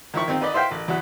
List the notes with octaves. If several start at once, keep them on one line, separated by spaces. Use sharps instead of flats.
D#3 F3 E4 E5 C#6
D#3 C4 F4
D#4 B4 D5 D#5
E4 C5 E5 F5 G5
A1
E2 F#4 E5